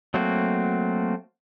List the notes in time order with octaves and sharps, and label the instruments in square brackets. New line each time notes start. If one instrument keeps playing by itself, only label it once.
[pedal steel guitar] F#3 A3 A#3 C4 F#4